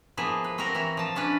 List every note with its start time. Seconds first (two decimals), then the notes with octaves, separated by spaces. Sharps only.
0.17 F3 A#3 B3 E4 G#4
0.44 B4
0.58 C4 F#4 G4 A#4
0.74 E3 E4 F#4 A#4
0.97 F3 A5
1.15 C3 C#4 D4 B4